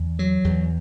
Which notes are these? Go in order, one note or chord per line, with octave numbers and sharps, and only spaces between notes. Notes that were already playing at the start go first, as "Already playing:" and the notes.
Already playing: E2
F#3
E2